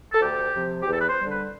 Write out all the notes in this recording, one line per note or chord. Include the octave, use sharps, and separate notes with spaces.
A4
D2 G4
C3 F3
G4
E2
A4
B4
C5
D3 G3
B4